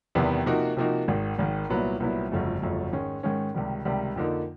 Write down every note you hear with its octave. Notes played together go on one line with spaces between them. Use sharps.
E2 C3 D#3 G3 B3
C3 F3 A#3 D#4 F#4
C3 F3 A#3 D#4 F#4
G#1 G#2 D#3
G#1 G#2 D#3
C2 A#2 F#3 B3 E4
C2 A#2 F#3 B3 E4
G1 F2 C#3 F#3 A3
G1 F2 C#3 F#3 A3
G#2 D#3 G#3 C#4
G#2 D#3 G#3 C#4
C#2 C3 D#3 G3
C#2 C3 D#3 G3
F2 D3 F3 A#3 D#4